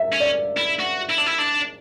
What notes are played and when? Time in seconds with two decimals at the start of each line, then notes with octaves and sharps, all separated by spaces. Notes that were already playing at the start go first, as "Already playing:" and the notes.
Already playing: E5
0.12 C#4
0.20 D5
0.57 E4
0.79 F#4
1.09 E4
1.18 D4
1.26 E4
1.39 D4